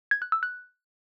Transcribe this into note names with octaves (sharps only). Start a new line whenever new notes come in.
G#6
F#6
E6
F#6